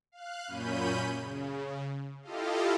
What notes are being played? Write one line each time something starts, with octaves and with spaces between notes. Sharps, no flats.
F5 F#6
F#2 A#2 C#4 B5 G6 D#7
C#3
E4 F4 G4 A4 D#5 F5